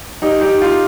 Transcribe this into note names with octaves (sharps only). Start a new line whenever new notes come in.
D#4 G4
D#4 G4
F4